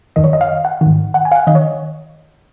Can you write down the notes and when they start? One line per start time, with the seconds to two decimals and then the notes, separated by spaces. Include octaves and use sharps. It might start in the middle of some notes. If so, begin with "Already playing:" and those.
0.16 F#2 D#3 D#5
0.24 C#5
0.33 D#5
0.41 F5
0.65 F#5
0.81 G#2 D#3
1.14 F#5
1.25 G#5
1.32 F5
1.36 F#5
1.47 D#3 D#5
1.55 C#5